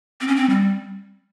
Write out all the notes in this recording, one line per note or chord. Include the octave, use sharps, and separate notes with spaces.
C4
C#4
C4
G3